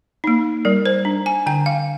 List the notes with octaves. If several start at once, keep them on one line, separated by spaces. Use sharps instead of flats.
A#3 D#4
G3 A#4
C5
D4
G#5
D3 G5
F5